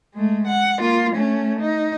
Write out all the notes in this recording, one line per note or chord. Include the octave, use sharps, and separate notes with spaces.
G#3 A3
F#5
A#3 F4
A3 C#4
D#4